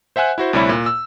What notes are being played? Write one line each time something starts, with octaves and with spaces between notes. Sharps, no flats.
C5 E5 F#5 G#5 F#6
E4 F#4 C5
D2 C3 G3 E4 C#5 B5
A#2
E6